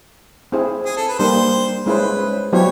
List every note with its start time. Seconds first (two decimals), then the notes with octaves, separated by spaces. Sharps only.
0.52 C4 E4 G#4 C5
0.86 G#4
0.97 A4
1.08 B4
1.19 G3 A#3 D4 G4 A#4 C5
1.85 G#3 C#4 E4 G#4 B4 C5
2.53 F#3 B3 E4 G4 C5 C#5